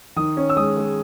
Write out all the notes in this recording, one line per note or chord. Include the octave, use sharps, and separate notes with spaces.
D#3 D#6
C#4
E6
G#3 D#6
G#3